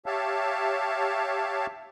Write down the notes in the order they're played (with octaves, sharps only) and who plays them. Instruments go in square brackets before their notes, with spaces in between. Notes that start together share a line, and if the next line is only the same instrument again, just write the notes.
[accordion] G4 C#5 E5 F5 A5